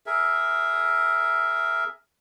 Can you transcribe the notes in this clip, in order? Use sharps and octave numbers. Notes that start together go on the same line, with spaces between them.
G#4 A#4 E5